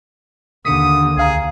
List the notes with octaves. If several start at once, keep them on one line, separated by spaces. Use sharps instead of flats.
D#2 D3 D#6 B6 C#7 D#7
C#2 G#4 F5 A#5